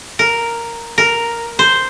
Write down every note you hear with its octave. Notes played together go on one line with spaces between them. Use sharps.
A#4
A#4
C5